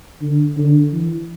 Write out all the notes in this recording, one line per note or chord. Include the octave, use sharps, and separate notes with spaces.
D3
D3
E3